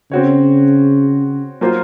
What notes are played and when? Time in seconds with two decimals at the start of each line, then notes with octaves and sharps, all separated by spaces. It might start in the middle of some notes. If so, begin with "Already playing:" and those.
0.11 C#3 C4 F#4 C#5
1.61 F#3 A#3 F4 C5